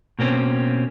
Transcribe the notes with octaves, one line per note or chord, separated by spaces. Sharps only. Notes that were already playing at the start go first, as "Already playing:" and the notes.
B2 A#3 C4 C#4